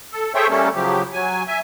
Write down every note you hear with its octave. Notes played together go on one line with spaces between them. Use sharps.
A4
G#4 A4 C5 C#5 E5 G5
G3 A3 A#3 C#4 A4
C#3 F3 F#3 G4
F#3 G#5
E5 G#5